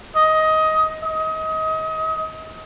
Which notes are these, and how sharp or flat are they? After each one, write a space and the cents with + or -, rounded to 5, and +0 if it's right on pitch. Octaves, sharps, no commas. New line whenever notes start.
D#5 +15
D#5 +30